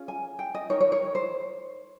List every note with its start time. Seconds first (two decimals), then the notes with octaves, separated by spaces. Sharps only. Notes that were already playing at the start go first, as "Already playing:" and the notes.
Already playing: C#4 F4 G#4
0.08 G#5
0.39 G5
0.54 D#5
0.69 D#4 A#4 C#5
0.81 C#5
0.92 C#5
1.15 C5